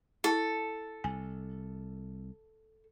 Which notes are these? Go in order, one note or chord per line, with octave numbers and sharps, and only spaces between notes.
E4 A4
C2 G#5